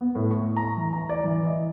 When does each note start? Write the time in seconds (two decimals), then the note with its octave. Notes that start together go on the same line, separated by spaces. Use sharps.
0.01 B3
0.15 A2
0.31 C#6
0.56 A#5
0.77 E3
0.93 A#5
1.09 D5
1.24 E3
1.45 D#5